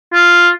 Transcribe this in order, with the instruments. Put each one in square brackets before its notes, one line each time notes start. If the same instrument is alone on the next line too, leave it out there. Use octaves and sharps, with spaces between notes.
[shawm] F4